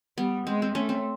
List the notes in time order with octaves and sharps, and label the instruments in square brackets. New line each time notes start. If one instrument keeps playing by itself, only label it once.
[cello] G3 [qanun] B3
[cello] G#3 [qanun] C4
[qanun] C4
[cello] A3 [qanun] C#4
[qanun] C4